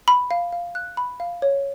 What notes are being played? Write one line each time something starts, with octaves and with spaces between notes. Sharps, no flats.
B5
F5
F5
F#6
B5
F5
C#5